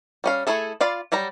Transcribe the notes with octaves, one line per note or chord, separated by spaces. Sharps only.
G3 C#4 F5
A3 E4 G#4 A4
F4 D5 F5 B5
F#3 G3 G5 A#5